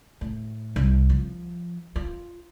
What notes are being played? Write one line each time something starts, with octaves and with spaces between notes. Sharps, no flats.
A2
C2
F3
F4